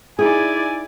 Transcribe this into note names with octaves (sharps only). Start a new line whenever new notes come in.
D#4 E4 G#4 D5 G#5